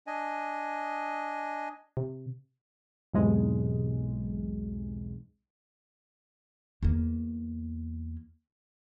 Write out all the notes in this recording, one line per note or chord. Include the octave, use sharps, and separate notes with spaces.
D4 D#5 G#5
C3
B1 E2 G#2 C3 G#3
E2 A#3